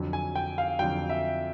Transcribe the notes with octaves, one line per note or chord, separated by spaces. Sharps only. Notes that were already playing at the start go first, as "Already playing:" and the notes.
Already playing: F2 D3 F#3
G#5
G5
F5
F2 D3 F#3 G5
E5